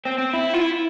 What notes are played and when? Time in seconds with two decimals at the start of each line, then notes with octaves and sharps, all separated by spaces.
0.05 C4
0.18 C4
0.33 E4
0.54 F4
0.61 E4